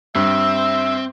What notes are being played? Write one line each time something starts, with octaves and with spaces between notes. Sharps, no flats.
G2 C4 E5